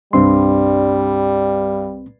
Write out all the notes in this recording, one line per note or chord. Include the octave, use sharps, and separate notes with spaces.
C2 G2 G3 C4 C6